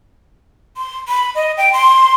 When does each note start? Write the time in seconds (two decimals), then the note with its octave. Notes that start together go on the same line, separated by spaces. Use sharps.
0.77 C6
1.08 B5
1.35 D#5
1.57 G5
1.73 C6